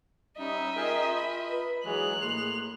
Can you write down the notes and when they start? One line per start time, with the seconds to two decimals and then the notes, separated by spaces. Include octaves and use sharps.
0.38 G3 C#4 D#4 D#5 E5
0.76 F4 G#4 A#4 G5
1.16 B5
1.49 B4
1.85 E3 F#3 G#3 G#4 F#6 F7
2.21 A2 A#3 C6